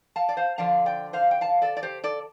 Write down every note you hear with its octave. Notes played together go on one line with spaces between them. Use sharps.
F5 A5
D5
C5 F5
D3 F3 D4 F5 A5
D5 G5
C5 F5
G5
F5 A5
A4 D5
D5
G4 C5
A4 D5